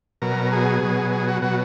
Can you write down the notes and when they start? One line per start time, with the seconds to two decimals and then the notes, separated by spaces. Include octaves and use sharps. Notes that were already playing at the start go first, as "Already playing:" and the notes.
0.22 B2 F#3 A#4
0.52 G#4
0.82 B2 F#3
1.12 G#4
1.28 F#4
1.42 B2 F#3 F#4